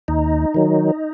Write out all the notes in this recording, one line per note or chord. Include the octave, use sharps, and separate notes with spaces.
D#2 D#4
D#3 F#3